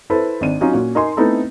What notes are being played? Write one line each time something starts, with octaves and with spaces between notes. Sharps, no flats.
E4 A4 B4 C5
G#1 D4 D#7
F#3 C#4 D#4 F4
A#2 C#4 F#4
D#4 A#4 D#5 G#5 C6
A3 B3 C4 D#4 E4 A4